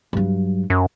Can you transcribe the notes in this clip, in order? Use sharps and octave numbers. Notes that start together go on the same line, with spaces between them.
G2 F#3
F#2